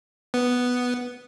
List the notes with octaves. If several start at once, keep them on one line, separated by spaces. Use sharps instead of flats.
B3